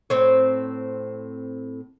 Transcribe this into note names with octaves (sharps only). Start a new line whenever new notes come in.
A2 C4 C#5